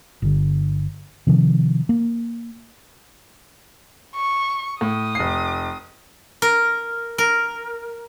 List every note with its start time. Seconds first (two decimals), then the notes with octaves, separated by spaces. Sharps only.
0.22 G1 D3
1.27 C3 D#3 F3
1.89 A#3
4.16 C#6
4.81 A2 D#6
5.15 F1 C7
6.42 A#4
7.18 A#4